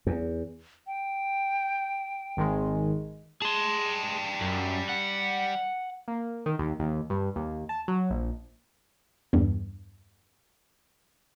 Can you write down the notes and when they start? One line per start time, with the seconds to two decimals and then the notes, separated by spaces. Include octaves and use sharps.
0.07 E2
0.87 G5
2.37 G#1 D#3 G#3
3.42 G3 G#4 A5 C6
4.41 F#2
4.89 F#5
6.08 A#3
6.46 D#3
6.59 D#2
6.79 D#2
7.10 G2
7.36 D#2
7.69 A5
7.88 F#3
8.10 A#1
9.33 E2 G2